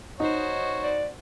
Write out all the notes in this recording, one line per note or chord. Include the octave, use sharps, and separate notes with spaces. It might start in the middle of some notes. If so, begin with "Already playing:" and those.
D#4 F#4 C5 C#5
D5